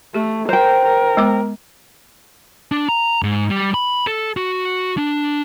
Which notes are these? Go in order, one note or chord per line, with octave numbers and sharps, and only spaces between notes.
A3 G4 A4
A#4 C5 G5
A#4
G#3 B3 D6
D4
A#5
G#2
G3
B5
A4
F#4
D4